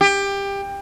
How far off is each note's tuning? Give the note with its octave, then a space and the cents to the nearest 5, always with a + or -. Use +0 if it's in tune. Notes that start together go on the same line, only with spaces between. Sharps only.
G4 +20